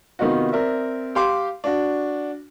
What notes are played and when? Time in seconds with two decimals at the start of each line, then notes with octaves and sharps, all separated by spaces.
0.19 C3 D#3 B3 D#4 F4 F#4
0.52 C4 A#4 D5 E5
1.15 G4 F5 C6 D6
1.64 D4 F#4